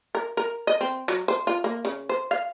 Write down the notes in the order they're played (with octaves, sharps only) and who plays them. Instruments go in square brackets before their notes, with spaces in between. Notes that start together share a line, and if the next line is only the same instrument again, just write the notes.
[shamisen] A#4
A#4
D#5
C4
F#3
C5
F4
A#3
C#3
C5
F5